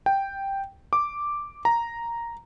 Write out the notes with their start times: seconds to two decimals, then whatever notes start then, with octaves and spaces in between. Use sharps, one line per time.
0.06 G5
0.93 D6
1.65 A#5